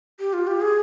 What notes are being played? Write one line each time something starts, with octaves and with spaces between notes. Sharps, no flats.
G4
F4
G4
G#4